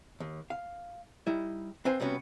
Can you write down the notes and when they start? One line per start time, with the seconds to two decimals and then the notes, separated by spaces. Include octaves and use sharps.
0.20 D#2
0.50 F5
1.27 G3 D#4 E4
1.85 C4 B4 C5 F5 G#5
2.00 C3 G3 B3 C#4 F#4